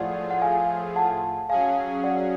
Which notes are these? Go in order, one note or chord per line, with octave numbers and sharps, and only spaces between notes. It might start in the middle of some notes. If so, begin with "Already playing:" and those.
Already playing: A2 F3 A3 F4 G#4 D5 F#5
F#5
F5 G#5
F#5 A5
F#3 C#4 G#4 F5 G#5
D5 F#5